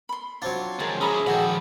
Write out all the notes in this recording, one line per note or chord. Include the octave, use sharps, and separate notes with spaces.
B5 C6
F#3 C4 D4 F4 C#5
D#3 F3 G#3 G#4 A#4 A5
C#4 E4 G#4 A#5 B5
A#1 D#3 G#3 F#4 A4 G5 B5